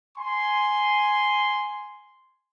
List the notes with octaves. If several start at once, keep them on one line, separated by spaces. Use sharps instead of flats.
G#5 C6